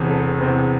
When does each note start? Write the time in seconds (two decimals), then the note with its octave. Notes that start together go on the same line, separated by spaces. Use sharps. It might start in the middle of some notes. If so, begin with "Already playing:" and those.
Already playing: E1 E2 C3
0.09 A4
0.41 E1 E2 C3 C5